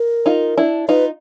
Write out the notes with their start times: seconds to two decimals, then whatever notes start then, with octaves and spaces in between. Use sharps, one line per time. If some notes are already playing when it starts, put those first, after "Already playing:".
Already playing: A#4
0.26 D#4 F4
0.58 D4 E4
0.88 D#4 F4 B4